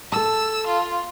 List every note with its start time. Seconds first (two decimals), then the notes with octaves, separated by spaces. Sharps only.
0.12 A4 A5 E6
0.67 F4